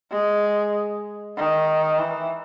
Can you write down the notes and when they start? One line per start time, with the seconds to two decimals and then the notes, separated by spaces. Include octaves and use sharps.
0.11 G#3
1.37 D#3
1.99 E3